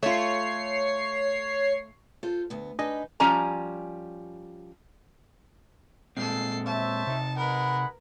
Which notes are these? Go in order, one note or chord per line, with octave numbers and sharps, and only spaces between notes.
A3 F4 C#5 C7
F4 A4 C5
D2 B3
D4 D#4 B4 D#5 G#5
F3 G3 C#4 G#5 A#5
A#2 G#3 C4 A4 C7
C5 C#5 E5 A5
C3 D#4
G#3 A#4 B4 F#5 B5